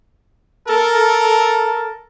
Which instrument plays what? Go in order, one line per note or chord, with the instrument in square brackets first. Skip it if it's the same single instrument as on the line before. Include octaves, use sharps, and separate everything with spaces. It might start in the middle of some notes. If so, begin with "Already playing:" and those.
[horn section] A4 A#4